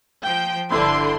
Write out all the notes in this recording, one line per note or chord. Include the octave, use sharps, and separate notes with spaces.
F3 G5
G1 D3 D4 E4 B4 C5 C6